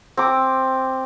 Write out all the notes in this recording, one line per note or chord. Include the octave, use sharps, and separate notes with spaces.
C4 D6